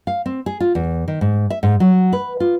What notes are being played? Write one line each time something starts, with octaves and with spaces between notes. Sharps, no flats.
F5
C4
G#4
F4
E2
D#3
G#2
E5
G#2
F#3
B4
F4